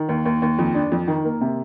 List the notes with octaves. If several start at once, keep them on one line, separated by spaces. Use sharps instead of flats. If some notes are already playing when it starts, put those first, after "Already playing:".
Already playing: D#3
D#2
D#2
D#2
F2
D4
F2
D#3
A#3
C3